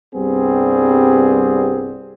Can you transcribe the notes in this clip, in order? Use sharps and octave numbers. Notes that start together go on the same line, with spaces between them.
C2 G2 G3 B3 C4 G#4